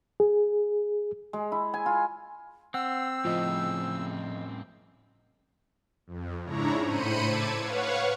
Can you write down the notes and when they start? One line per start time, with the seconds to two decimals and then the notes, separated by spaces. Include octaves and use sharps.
0.20 G#4
1.33 G#3
1.52 E4
1.74 G#5
1.86 F4
2.74 C4 F#5 E6
3.25 A2 C#3 F3 D#5
6.07 F2
6.45 G#2 C#3 D4 E4 C#5 A#5
6.84 A2 C5 B5 C#7 D#7
7.23 A5 D6 E6 G#6
7.58 B4 C#5 F5 F#5 C#6